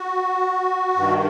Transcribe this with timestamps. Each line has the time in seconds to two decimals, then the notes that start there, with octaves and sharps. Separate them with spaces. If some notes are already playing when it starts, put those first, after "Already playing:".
Already playing: F#4
0.96 G2 D#3